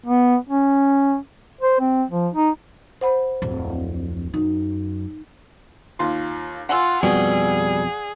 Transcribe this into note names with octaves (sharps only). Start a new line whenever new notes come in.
B3
C#4
C5
C4
F3
D#4
C5 F#5 B5
D1 F2
F#2 D#4
D#2 F4 C6
F4 F#5 G#5 E6
F2 B2 G3 G#4